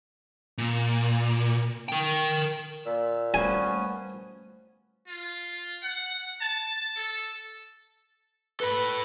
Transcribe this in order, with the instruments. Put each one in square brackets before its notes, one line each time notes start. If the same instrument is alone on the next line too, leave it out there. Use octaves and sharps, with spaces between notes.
[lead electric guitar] A#2
A#4 G5
[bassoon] A#2 [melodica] E6
[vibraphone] G3 A3 C5 [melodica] B3 C#4 [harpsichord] G#5
[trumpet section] F4
F#5
A5
A4
[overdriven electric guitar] A4 B5 [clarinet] B4